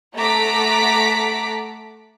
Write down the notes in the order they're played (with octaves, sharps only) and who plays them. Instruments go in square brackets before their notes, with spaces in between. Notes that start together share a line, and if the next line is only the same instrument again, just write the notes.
[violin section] A3 F#5 A5 A#5 D6 B6